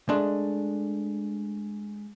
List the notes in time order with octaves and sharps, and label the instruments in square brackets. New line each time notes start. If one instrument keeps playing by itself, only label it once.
[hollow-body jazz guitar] G#3 A3 D4 D#5